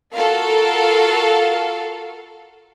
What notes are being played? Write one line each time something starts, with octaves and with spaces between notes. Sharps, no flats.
F4 F#4 A4 A#4 F5